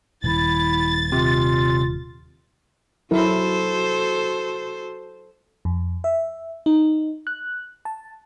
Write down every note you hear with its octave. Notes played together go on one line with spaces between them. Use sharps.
D#1 E4 A6
C3 F4
F#3 E4 F#4 A4 A#4 C5
F2
E5
D#4
F#6
A5